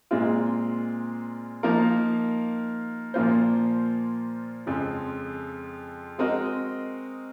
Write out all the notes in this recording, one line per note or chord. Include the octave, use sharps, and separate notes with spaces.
A#2 G#3 C4 F4
F3 A#3 D#4 A#4 F5
A#2 F3 A#3 F4 C5
F2 C#3 F3 G#3
G#3 C4 F#4 A#4 D#5